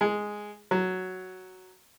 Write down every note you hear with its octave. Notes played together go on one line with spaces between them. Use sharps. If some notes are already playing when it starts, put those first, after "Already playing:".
G#3
F#3